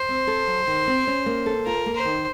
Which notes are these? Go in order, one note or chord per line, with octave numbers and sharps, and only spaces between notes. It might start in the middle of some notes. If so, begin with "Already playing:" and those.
Already playing: C5
C4
A4
F#3
D#3
C4
C#4
A#3
A4
F4 A#4
A#3
C5
D#3